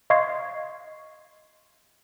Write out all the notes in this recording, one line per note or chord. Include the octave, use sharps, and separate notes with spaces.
D#5 F5 C6 C#6 G#6 C7